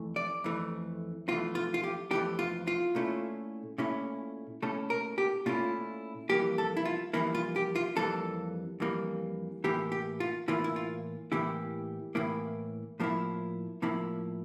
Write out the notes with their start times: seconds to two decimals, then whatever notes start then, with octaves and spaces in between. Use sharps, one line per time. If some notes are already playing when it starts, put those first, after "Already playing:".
Already playing: F2 E3 A3
0.16 D5
0.44 F2 E3 A3
1.28 F2 E3 A3 F4
1.55 F4
1.74 F4
1.84 G4
2.11 F2 E3 A3 G4
2.39 F4
2.67 F4
2.95 A#2 A3 C#4 E4
3.78 A#2 A3 C#4 E4
4.62 A#2 A3 C#4 E4 A4
4.90 A#4
5.18 G4
5.46 A#2 A3 C#4 E4 F4
6.29 F2 E3 G3 A#3 G4
6.58 A4
6.77 E4
6.85 F4
7.13 F2 E3 G3 A#3 E4
7.35 F4
7.56 G4
7.76 F4
7.97 F2 E3 G3 A#3 A4
8.80 F2 E3 G3 A#3
9.64 A2 E3 A#3 E4 G4
9.92 G4
10.20 F4
10.48 A2 E3 A#3 E4 F4
10.64 E4
10.76 F4
11.32 A2 E3 A#3 E4 G4
12.15 A2 E3 A#3 E4
13.00 A2 F3 A#3 E4
13.82 A2 F3 A#3 E4